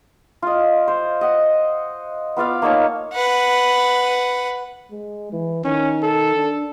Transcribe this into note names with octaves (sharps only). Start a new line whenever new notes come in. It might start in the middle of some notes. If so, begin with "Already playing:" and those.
F4 D#5
C5
D#5 F#5
B3 F4 D5 F5
A#3 D#4 C#5 A5
B4 F#5
G#3
E3
D#3 C#4
A4
D4